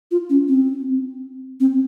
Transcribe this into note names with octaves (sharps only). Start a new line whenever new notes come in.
F4
C#4
C4
C4